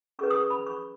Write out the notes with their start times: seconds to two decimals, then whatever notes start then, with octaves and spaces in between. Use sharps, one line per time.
0.19 C#4 G#4 B4 C#6
0.30 D#6
0.35 C#6
0.50 B5
0.67 C#6